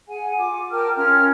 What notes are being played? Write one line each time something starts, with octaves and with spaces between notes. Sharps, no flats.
G#4 F#5 G#5
F4 D6
A#4 G5 A5 F6
C#4 F4 A#4 F6